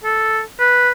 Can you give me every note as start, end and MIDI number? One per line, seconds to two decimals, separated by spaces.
0.04 0.41 69
0.60 0.91 71